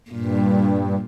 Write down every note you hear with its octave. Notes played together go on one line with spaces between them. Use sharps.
G2 A#2